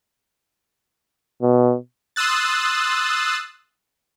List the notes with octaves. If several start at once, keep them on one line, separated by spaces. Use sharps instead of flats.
B2
C6 D#6 E6 F#6 A6